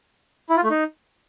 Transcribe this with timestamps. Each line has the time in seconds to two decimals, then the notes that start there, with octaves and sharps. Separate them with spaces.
0.50 E4
0.56 F4
0.63 A3
0.70 D#4